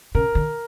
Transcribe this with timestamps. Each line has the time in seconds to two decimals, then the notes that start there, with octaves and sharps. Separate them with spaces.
0.15 C#3 A#4
0.35 D3